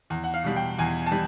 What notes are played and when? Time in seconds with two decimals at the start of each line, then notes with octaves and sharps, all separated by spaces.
0.10 E2
0.24 F#5
0.34 F5
0.44 B2 G3
0.56 G5
0.78 E2 G#5
1.06 A5
1.12 G3